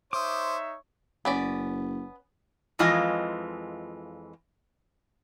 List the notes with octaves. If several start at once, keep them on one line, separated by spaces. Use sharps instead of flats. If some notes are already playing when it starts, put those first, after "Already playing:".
D#4 C5 C#5 E5 D6 D#6
F#1 B3 C#4 D5
F2 E3 G#3 F4 D#5 G#5